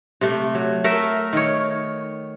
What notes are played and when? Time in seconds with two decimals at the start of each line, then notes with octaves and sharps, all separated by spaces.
0.21 C3 A3
0.55 F#3
0.84 A3 A#4 E5
1.33 D#3 C#5